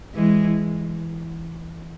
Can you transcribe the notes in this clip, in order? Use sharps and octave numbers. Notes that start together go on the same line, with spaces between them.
E3 G#3